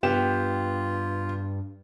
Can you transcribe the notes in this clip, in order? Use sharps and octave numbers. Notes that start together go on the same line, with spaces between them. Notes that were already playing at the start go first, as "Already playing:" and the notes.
G2 B3 F4 G4 G5 E7